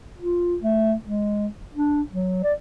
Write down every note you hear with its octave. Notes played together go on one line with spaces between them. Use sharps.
F4
A3
G#3
D4
F#3
D5